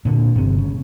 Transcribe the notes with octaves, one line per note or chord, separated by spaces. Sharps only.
A#2 D3
G1 C3
C#3